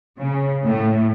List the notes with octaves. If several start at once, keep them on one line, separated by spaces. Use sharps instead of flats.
C#3
A2